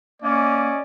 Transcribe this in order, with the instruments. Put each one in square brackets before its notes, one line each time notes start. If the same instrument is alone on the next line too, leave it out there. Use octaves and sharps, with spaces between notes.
[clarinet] A#3 [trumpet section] C#4 D5 D#5